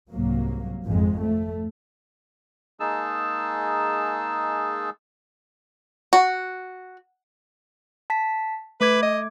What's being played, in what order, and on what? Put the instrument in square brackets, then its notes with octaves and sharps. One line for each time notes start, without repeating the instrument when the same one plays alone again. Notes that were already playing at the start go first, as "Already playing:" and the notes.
[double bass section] C2 G#2 F#3 A#3
G#1 F2 G#3
A3
[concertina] G#3 A#3 D#4 G#4 A5 E6
[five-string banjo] F#4
[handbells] A5 B6
[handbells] A3 D6 G#6 [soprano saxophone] B4
[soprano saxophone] D#5